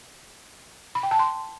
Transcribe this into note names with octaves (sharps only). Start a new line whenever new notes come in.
B5
G5
A5
C6